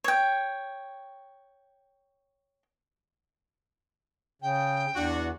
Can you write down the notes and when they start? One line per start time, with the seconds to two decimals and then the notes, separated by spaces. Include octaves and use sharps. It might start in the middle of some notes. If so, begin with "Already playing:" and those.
0.04 C#5 G5
4.42 C#3 G5
4.95 E2 D4 F#4